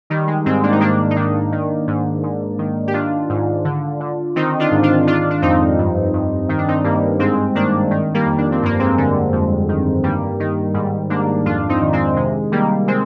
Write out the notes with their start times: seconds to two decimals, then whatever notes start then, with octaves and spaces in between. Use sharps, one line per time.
0.10 D#3 G3
0.27 G#3
0.46 G#2 G#3 C4
0.63 A#3 D4
0.72 D#4
0.80 D#3 A#3 D4
1.10 D#4
1.16 D#3 A#3 D4
1.52 D#3
1.87 G#2
2.23 G#2
2.59 D#3
2.87 G4
2.94 D#3 D4 F4
3.29 G#2
3.65 D3
4.00 D3
4.36 D#3 C4 D#4
4.59 D4 F4
4.71 G#2
4.83 D4 F4
5.07 D#3 D4 F4
5.31 D4
5.42 F2 C4 D#4
5.78 G2
6.13 G2
6.49 D#3 D#4
6.58 D4
6.68 C4 D#4
6.84 G2 G3 A#3
7.19 G#2 G#3 C4
7.55 D#3 A#3 D4
7.91 D#3
8.14 G3 A#3
8.26 F2
8.38 D4
8.52 C4
8.62 G2 A#3
8.79 G#3 C4
8.98 D3
9.32 F2
9.69 D#3
10.03 G2 G3 A#3
10.40 D#3
10.74 G#2 G3
11.10 G#2 A#3 D4
11.45 F2 D4 F4
11.69 C4 D#4
11.81 D#3
11.93 G#3 C4
12.16 C3 G#3
12.52 D#3 G3 A#3
12.88 G#3 C4